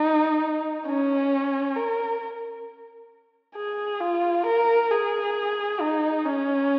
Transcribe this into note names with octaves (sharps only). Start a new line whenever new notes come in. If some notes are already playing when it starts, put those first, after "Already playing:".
Already playing: D#4
C#4
A#4
G#4
F4
A#4
G#4
D#4
C#4